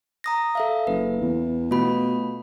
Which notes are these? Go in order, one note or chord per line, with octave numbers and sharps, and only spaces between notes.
A#5 D#6 A#6
A4 E5 F5
F#1 B4
E2
B2 A3 F4 B5